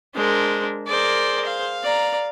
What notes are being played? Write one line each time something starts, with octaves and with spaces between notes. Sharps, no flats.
G#3 D4 A#4 C5
G#4 A#4 C5 D5
F5
D5 A#5